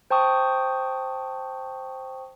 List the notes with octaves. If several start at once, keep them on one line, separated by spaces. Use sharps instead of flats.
C5 G5 A5 C#6 D#6